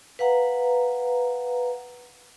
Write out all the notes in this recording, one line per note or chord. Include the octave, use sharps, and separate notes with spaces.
B4 F5 F#5 A#5